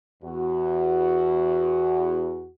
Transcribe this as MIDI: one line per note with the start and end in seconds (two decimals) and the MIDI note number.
0.23 2.48 40
0.23 2.48 66